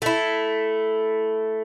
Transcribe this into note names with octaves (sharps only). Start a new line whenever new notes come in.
A3 E4